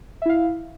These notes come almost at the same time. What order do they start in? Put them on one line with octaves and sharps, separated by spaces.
E5 E4 F5